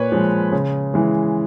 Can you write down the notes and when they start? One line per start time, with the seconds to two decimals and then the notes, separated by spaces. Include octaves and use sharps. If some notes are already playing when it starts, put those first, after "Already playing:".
Already playing: A#2 B4 C#5
0.12 F3 G#3
0.52 C#3
0.94 E3 G#3